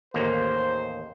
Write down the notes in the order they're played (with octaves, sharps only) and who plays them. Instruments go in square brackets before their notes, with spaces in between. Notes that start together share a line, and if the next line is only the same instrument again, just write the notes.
[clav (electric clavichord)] A1 D#2 A#3 [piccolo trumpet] C5